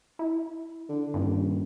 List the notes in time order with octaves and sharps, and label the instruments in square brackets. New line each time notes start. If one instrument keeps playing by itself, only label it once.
[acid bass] E4
[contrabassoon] D3
[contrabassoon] D#1 [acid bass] G2